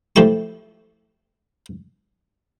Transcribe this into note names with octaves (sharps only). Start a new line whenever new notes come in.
F3 A3 E4 G4 C#6